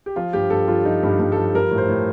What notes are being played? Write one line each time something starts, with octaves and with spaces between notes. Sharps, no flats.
G4
F3 F4
G2 G4
G2 A4
F3 F4
F3 D#4
G2
G4
G2
F3 A4
G3 A#4
A2
C5
A2